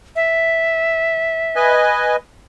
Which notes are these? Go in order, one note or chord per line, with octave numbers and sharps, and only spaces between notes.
E5
B4 D#5 G#5